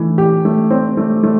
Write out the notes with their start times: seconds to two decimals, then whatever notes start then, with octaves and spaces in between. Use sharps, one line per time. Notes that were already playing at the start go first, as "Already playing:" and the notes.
Already playing: E3 A3
0.18 G4
0.45 A3
0.70 C4
0.97 A3
1.23 A3